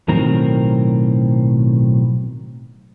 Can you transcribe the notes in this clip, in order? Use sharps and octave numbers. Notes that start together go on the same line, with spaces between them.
B1 A2 D#3 F#3 C4 A#4